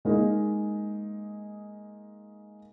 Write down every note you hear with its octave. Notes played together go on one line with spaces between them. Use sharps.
G#3 A#3 D#4